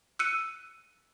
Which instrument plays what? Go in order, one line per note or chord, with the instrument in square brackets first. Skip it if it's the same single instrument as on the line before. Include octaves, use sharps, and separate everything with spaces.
[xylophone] E6 F#6 C#7 D#7